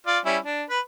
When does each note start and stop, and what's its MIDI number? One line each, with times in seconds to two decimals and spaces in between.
0.07 0.19 65
0.07 0.19 74
0.25 0.37 55
0.25 0.37 61
0.25 0.37 64
0.45 0.63 62
0.70 0.80 71
0.70 0.80 83